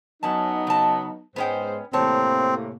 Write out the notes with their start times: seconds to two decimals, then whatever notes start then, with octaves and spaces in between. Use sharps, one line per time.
0.23 F#2 F#3 B3 C#4 D#4 A5
0.67 C#3 A5
1.36 G#2 G#3 B3 C#4 C5 G5
1.93 E2 A2 C3 A#3 C4 C#5 A5